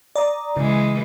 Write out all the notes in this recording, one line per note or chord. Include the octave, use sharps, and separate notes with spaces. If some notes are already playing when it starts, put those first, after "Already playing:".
D5 A#5 D#6
C#3 E3 G#3